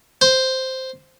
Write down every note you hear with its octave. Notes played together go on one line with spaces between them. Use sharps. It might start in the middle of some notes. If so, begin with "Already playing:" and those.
C5